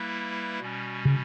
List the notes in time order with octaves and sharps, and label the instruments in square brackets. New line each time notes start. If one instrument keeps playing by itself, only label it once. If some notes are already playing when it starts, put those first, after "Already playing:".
Already playing: [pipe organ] G3 A#3 E4 B4 E5
B2 G3 C#4
[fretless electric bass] C#3